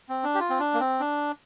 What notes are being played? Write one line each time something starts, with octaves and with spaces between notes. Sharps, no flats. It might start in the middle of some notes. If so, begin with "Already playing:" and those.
C4
D4
G4
F4
C4
D4
A#3
C4
D4